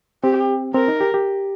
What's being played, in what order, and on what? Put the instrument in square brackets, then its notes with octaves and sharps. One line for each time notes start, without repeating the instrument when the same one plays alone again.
[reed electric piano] C4 [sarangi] G4
[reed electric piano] C4 [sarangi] A#4
[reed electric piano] D#4
G4
G4